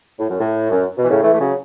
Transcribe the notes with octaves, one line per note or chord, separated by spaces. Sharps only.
A2
F#2
A2
F#2
B2
E3
A2 C#3
E3 A3
A3
C#3 F#3